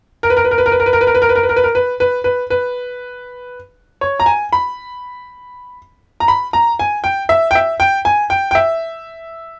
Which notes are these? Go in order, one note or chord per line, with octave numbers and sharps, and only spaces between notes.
A#4
B4
A#4
B4
A#4
B4
A#4
B4
A#4
B4
A#4
B4
A#4
B4
A#4
B4
A#4
B4
A#4
B4
A#4
B4
B4
B4
B4
C#5
A#5
G#5
B5
A#5
B5
A#5
G#5
G5
E5
G5
E5
G5
G#5
G5
G5
E5